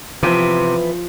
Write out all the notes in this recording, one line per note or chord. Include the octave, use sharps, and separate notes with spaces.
C3 E3 F3 B3 B4